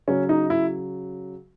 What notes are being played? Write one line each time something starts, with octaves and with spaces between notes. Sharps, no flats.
C#3 F#3 C#4
D#4
E4